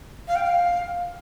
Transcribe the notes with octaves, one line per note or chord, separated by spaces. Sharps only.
F5
G5
F5